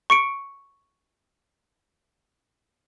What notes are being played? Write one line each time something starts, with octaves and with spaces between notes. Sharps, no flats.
C#6 C#7 D7